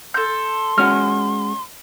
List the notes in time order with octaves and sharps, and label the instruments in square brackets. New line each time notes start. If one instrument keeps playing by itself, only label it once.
[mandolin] A4 G6 [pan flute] C6
[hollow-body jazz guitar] G#3 C#4 F#4 [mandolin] F6